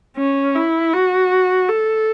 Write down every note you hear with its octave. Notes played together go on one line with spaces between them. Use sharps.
C#4
E4
F#4
A4